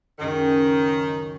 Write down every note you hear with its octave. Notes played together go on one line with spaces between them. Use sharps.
C#2 F#2 D#3 C#7